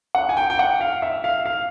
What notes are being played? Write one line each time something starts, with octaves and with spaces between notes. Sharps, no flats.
F#5
G#5
G5
G5
F#5
F5
E5
F5
F5